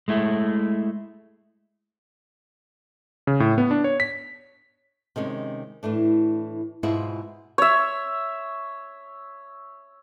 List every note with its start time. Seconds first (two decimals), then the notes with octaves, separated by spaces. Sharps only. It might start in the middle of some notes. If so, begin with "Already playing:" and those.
0.08 G#3 A3 E4
3.27 C#3
3.40 A2
3.58 B3
3.71 D4
3.84 C#5
4.00 B6
5.16 C3 D#3 G#3 C#4
5.83 A2 E3 A3 D4
6.83 G#2 B2 E4 F4 G#4
7.58 C#5 E5